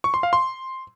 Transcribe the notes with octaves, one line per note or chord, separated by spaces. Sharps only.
C#6
C6
F5
C6